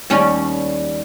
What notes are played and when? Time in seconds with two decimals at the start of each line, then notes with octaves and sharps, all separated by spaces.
0.10 D#2 G3 C#4